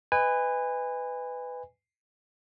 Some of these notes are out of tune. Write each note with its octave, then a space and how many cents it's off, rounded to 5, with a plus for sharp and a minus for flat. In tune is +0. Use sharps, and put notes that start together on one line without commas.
B4 +15 D#5 +0 G#5 -25